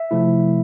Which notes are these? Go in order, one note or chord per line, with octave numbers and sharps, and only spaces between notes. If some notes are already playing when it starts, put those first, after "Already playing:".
Already playing: E5
C3 F3 A3 E4